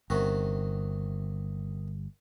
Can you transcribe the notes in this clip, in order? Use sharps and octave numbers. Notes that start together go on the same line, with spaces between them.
G1 C3 D#3 F#4